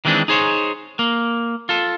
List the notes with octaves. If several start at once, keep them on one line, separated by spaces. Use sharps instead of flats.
D#3 E3 G#3 C4 D4
D#4 G#4 C5 C#5
A#3
F4 A4